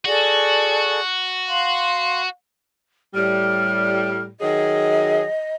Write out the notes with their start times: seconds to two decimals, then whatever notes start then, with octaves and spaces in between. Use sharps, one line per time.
0.05 F#4 G#4 A4 D5
1.48 F5 C6
3.14 A2 G3 F6
4.40 D#3 F#3 G#4 D#5